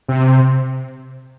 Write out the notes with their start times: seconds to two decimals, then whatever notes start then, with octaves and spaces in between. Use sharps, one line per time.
0.08 C3